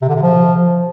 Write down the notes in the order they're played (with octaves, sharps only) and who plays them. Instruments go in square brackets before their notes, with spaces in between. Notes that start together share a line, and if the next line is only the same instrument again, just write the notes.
[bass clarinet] C3
D3
C3
F3